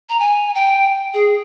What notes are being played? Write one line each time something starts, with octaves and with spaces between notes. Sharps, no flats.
A#5
G#5
G5
G#4